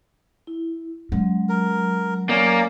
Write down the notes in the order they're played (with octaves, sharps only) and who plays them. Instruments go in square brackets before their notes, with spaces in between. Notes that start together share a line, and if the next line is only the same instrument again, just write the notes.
[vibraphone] E4
[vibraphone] F#3 [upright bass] G#3 C#4
[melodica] A#4
[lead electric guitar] A#3 [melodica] C#4 D5